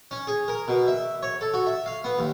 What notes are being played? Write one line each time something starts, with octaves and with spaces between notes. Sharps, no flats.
C#4
G#4
A#4
B2
E5
C#5
A4
F#4
E5
F5
B3
D#2